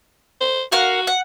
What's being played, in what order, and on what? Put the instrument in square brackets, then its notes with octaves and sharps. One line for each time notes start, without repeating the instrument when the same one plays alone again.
[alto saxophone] C5
[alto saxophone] F#4 [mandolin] A#4 F5 F#5
[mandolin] F#5